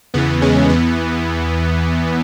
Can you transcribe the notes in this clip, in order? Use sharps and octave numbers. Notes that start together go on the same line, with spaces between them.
E2 C#3 E3 B3
G#3 C#4
E2 E3 B3